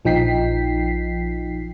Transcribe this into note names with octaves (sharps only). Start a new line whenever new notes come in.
A#1 F3 D#4 G5 B6 C7